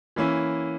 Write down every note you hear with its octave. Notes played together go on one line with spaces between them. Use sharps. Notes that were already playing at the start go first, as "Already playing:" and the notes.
E3 A#3 C#4 E4